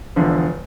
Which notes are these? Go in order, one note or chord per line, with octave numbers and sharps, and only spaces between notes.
E1 E2 D3 F3